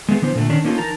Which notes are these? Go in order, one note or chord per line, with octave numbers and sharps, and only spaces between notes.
G#3 A3 B3 G#4
D3 E3 B3 C5
A#2 D3 A3
D3 D#3 C#4 D4
A#3 C#4 D#4 F4 A4
E3 D#4 A#4 A5 A#5